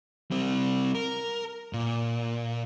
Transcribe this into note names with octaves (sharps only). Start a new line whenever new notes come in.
G3 C4
A#4
A#2